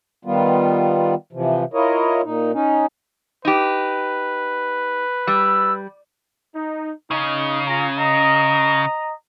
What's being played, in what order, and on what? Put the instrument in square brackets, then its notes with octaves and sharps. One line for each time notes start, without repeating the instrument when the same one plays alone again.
[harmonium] D#3 G3 B3 F4
C3 E3 F3
E4 F4 A#4 C#5 D#5
A#2 D#4
C#4 D#4
[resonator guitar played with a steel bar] D#4 G4 [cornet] B4
[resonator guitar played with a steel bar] G3 [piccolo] E6
[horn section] D#4
[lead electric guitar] C#3 [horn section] D#4
[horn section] F4 G#5 A#5
D#5 A#5